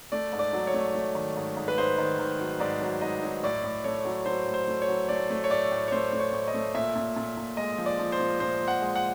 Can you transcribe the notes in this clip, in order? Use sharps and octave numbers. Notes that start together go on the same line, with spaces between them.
A3 D5
G#2
D5
F#3
C#5
A3
A3
D#3
G#2
G#2
B4
G#2 C5
D#3
D#3
F#3
G#2 D5
F#3
G#2 D#5
F#3
A2 D5
A2
A3 C#5
F#3
F#3 C5
A2
C5
A3
C#5
F#3
A3 D5
A3
C#5
A2 D5
A2
C#5
A3 C5
A3
C#5
A2
D#5
A3
A#2 E5
A#2
A#2
A#2
G#3 D#5
F3
D5
F3
C5
A#2
A#2 C5
F3
F#5
G#3
F#5